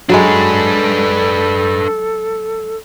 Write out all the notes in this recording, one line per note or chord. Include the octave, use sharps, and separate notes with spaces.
F#3 G#3 D4 A4 B4